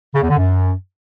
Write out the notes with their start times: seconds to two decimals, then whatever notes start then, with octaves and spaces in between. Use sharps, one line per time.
0.14 C#3
0.22 E2
0.30 D3
0.38 F#2